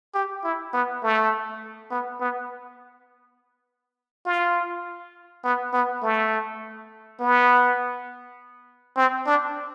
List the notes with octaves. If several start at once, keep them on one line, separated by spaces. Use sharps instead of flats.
G4
E4
B3
A3
B3
B3
F4
B3
B3
A3
B3
C4
D4